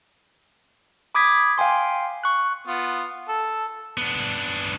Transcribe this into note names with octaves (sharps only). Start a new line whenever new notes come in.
B5 D6 D#6 G#6 B6
F5 G5 G#5 C6
C#6 F#6
B3 F4
A4
B3 D4